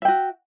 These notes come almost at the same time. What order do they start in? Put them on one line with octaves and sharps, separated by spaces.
E5 G5 F#4